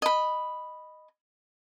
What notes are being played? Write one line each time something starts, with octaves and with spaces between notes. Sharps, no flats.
D#5 B5